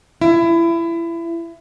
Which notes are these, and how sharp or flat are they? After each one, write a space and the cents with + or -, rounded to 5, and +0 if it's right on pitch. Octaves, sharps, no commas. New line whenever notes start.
E4 +25